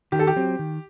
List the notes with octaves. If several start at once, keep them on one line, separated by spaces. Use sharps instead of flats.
D#3 G4
A4
G4
F#3 C4
D#3